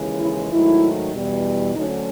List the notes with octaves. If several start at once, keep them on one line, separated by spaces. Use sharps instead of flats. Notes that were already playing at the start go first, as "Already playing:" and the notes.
Already playing: D#2 C#3 E3 G#3
E4
G#2 D#3 F#3 A3 E4
E2 B2 G3
D2 D3 F#3 A3 C#4 D#4